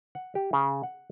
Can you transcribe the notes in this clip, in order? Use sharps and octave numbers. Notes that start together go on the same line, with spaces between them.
F#5
G4
C#3
F#5